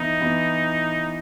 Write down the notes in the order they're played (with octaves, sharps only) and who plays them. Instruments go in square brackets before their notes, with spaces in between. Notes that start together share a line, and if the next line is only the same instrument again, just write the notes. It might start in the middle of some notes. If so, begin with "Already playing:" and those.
Already playing: [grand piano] E3 B3 E4 [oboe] D#4
[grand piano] E3 B3 E4